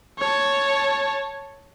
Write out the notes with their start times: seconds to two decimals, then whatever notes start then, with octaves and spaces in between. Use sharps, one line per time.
0.19 C#5 A5